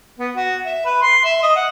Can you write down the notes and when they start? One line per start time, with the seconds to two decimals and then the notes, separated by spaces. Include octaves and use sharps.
0.19 B3
0.36 F#4
0.66 E5
0.85 B4
1.02 C6
1.24 E5
1.43 D#5
1.56 F#5